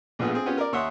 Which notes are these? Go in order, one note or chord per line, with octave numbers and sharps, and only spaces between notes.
A#1 A2 B3 F4 G#4
C4 G#4
B3 C#4 F4 G4
A#4 D5
D#2 C#5 E5 F#5 C6 D#6